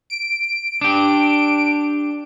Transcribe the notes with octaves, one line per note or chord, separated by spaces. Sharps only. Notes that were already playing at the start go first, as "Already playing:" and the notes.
D7
D4 G4